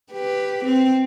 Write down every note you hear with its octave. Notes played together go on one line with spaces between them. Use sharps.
G4 B4
C4